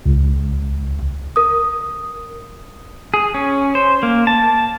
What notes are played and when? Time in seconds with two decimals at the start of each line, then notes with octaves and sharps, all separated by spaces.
0.06 C#2
1.36 A#4 D#6
3.14 G#4
3.34 C#4
3.75 C5
4.03 A#3
4.27 A5